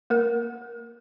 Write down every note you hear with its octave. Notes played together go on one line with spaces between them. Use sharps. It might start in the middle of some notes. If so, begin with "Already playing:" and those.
A#3 A#4